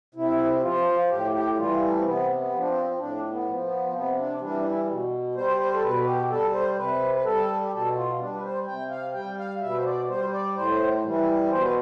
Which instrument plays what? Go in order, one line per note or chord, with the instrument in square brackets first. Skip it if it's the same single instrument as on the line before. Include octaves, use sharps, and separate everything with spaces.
[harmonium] C3 E4
F3 F4
A2 G4
G4
E3 G3 F4
A3
C4
C3 B3
B3
F3
D4
C4
A2 D4
B3
F3
B3
C4
C3 B3
D4
E3 G3 D4
D4
E4
B2
G3 C5
C5
A4
B2 B4
G4
G3 A4
C5
C3 B4
B4
G3 A4
G4
B2 A4
F4
G3 D4
B4
C5
C3 G5
F5
G3 G5
F5
B2 E5
B4
C5
D5
G3 C5
D5
A2 C5
E3 G3
B2 C5
B4